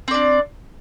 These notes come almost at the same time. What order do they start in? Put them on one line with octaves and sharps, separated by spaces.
C4 D5 D4